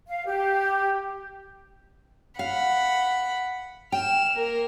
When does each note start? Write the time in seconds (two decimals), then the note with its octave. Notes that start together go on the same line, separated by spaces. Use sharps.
0.08 F5
0.26 G4
2.39 F5 F#5 B5
3.92 G5 F6 E7
4.34 A#3 A#4